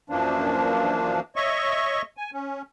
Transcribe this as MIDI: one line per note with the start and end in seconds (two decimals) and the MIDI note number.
0.10 1.20 42
0.10 1.20 52
0.10 1.20 53
0.10 1.20 58
0.10 1.20 62
1.36 2.02 73
1.36 2.02 75
1.36 2.02 76
1.36 2.02 85
2.17 2.31 80
2.33 2.62 61